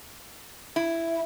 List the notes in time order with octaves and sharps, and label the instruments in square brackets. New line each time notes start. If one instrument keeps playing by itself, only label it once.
[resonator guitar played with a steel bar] E4